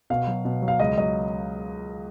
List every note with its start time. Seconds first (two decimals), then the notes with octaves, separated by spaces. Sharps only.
0.10 B2 F5
0.27 F#3
0.45 B2
0.62 F#3
0.68 F5
0.79 C#2 D#5
0.97 F#3 D#5